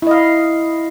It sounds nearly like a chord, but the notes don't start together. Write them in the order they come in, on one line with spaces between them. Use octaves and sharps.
E4 D#5 F5